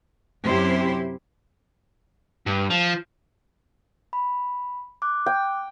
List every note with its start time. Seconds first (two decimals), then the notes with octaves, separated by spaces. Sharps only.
0.45 F#2 C3 E4 G4 C5
2.47 G2
2.71 F3
4.13 B5
5.02 D6 F#6
5.26 G5